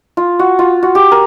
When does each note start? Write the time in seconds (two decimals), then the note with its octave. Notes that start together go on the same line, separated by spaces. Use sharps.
0.17 F4
0.39 F#4
0.59 F4
0.83 F#4
0.95 G4
1.12 A#4